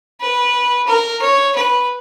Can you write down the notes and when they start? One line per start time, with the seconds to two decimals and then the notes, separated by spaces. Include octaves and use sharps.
0.20 B4
0.87 A#4
1.22 C#5
1.56 B4